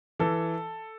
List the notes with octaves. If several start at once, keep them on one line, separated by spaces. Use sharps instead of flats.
E3 A4